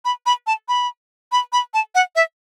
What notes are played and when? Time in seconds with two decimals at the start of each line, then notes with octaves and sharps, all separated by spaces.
0.05 B5
0.26 B5
0.47 A5
0.68 B5
1.32 B5
1.53 B5
1.74 A5
1.95 F#5
2.16 E5